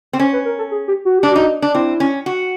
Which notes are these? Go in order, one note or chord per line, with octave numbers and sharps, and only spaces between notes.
C4
C#4 C5
B4
A#4
A4
G#4
G4
F#4
D4 G4
D#4 F#4
D4
C4 E4
C#4
F#4